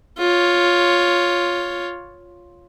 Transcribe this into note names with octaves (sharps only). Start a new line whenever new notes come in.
F4 C#5